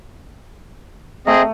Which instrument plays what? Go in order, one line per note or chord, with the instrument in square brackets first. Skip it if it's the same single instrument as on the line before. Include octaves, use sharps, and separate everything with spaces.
[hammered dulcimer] A3 [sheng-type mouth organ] C4 G#4 D#5